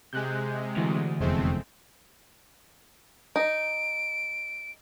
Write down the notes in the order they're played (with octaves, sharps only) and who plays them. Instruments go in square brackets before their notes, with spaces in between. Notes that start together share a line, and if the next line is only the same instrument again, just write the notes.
[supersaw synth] C3 G#3 [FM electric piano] G#5 F#6 G6
[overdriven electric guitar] D2 [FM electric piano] E3
[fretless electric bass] F1 E2 [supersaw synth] G#3 A3 C4
[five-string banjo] D#4 [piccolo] D7